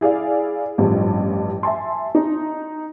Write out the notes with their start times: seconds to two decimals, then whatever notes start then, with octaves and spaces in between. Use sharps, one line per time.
0.01 E4 G#4 D5 F5
0.78 A1 G2 F3
1.63 E5 G#5 A5 C6
2.15 D#4